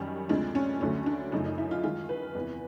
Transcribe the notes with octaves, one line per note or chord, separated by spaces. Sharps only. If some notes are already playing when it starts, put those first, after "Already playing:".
Already playing: F#2 D#3 G3 C#4
D2 C3 F3 G#3 D4
C#4
D2 D3 F#3 A3 C#4
D4
F#2 C#3 F3 A3 D#4
D#4
E4
F4
F#2 D#3 G#3 F4
B4
E2 C3 E3